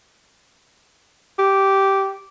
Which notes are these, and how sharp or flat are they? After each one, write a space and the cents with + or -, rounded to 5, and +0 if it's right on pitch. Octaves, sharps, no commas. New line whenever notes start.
G4 -10